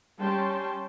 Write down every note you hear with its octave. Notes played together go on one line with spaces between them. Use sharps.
G3 C#4 G5 A5 C6